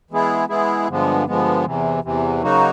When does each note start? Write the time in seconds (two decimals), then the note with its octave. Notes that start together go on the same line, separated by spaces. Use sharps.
0.11 E3 G#3 B3 E4 G#4
0.49 E3 G#3 B3 E4 G#4
0.88 G2 D3 F3 G#3 B3
1.27 G2 D3 F3 G#3 B3
1.65 E2 C3 E3
2.04 E2 C3 E3
2.42 C#3 F#3 A#3 D#4 F#4